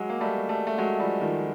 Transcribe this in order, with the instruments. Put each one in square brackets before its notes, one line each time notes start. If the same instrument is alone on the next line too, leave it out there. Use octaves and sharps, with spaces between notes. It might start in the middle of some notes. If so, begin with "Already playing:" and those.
Already playing: [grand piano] F#3 G#3
A#3
G3 A3
G3 A3
A3
F#3 G#3
F3 G3
D#3 F3